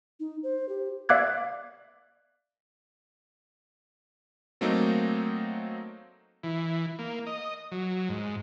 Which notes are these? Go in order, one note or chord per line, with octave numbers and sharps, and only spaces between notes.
D#4
C5
G4
D5 E5 F5 D6 F#6 G#6
F#3 A3 A#3 C4 D#4
E3
A#3
D#5
F#3
G#2